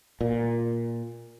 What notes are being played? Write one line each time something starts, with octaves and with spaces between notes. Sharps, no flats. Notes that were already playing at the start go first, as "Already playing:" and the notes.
A#2